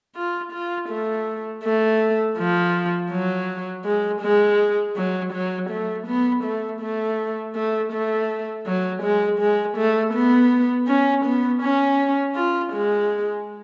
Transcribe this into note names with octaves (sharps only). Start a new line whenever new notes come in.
F4
F4
A3
A3
F3
F#3
G#3
G#3
F#3
F#3
A3
B3
A3
A3
A3
A3
F#3
G#3
G#3
A3
B3
C#4
B3
C#4
F4
G#3